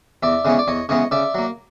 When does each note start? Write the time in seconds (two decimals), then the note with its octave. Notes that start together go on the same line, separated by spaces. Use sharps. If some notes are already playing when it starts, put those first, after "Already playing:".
0.23 E2 D5 E5
0.45 C#3 E3 G#3 B3 C#5
0.59 D5
0.68 E2 C#5 D#5
0.89 C#3 E3 G#3 B3 C#5 D#5
1.11 C#3 D5 E5
1.35 F#3 A#3